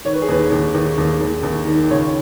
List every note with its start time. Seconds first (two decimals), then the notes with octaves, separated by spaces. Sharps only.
0.05 D#3 C#5
0.13 B4
0.22 G#4
0.29 D#2 B4
0.52 D#2
0.75 D#2
0.98 D#2
1.21 D#2
1.43 D#2
1.67 D#3
1.90 C#2 C#5